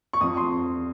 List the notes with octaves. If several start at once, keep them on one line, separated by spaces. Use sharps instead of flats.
C#6
F2 D#6
C6